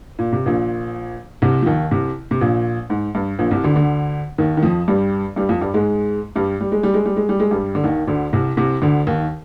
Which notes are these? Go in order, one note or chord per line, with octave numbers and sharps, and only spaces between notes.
A#2
C3
A#1 A#2
C2 C3
F3
D#2 D#3
C2 C3
C3
A#1 A#2
G#2
G2
A#1 A#2
C2 C3
D2 D3
D2 D3
D#2 D#3
D#3
F2 F3
G2 G3
G2 G3
F2 F3
G2 G3
G#2 G#3
G2 G3
G3
G#3
G3
G#3
G3
G#3
G3
G#3
G2 G3
D3
D#2 D#3
D2 D3
C2 C3
C2 C3
D2 D3
D#2 D#3